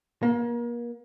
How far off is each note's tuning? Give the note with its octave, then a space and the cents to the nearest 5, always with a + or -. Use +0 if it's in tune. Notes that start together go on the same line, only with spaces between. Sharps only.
A#3 +35